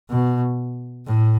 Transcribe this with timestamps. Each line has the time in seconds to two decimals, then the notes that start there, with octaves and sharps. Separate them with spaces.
0.10 B2
1.07 A2